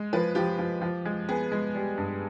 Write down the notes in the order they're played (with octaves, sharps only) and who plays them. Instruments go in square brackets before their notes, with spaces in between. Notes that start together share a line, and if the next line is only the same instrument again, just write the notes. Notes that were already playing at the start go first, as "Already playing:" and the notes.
Already playing: [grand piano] G#3
[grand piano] F3 [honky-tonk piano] B4
[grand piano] F3 [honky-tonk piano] G4
[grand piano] F3
F3
G#3
[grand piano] B3 [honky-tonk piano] G#4
[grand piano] G#3
G3
G2